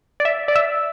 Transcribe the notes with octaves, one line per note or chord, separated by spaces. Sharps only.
D5
E5
D5
E5